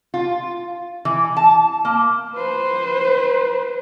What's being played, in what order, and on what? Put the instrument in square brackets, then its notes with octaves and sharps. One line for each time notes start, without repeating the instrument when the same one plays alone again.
[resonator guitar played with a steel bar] F4
E3
A5
A#3
[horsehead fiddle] B4 C5